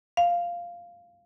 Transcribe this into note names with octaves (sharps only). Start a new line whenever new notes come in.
F5